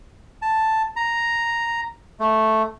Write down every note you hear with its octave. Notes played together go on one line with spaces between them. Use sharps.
A5
A#5
A3